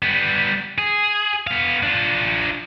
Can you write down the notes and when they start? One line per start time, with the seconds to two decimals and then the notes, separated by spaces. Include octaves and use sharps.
0.02 G3 B3
0.78 G#4
1.47 B3 F5
1.83 D4 F4